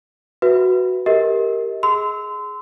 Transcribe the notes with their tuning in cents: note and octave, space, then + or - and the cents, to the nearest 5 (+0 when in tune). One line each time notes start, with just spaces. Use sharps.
F#4 +0 B4 +0 E5 +0
G4 +0 A#4 -10 D#5 +40
G#4 +10 C6 -30 E6 -15